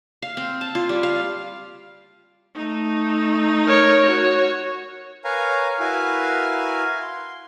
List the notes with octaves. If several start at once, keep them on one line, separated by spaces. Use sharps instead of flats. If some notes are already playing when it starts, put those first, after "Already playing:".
F5
C4
A5
F4
G3
F5
A3 D#4
A#4 C#5
F#4 C#5
A#4 B4 C#5 F5 G#5 A#5
E4 F#4 A#4 B4 F5 G#5
C6